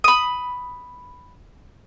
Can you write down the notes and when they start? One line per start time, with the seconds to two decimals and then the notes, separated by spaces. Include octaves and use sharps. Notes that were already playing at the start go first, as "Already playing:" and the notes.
0.04 B5 D#6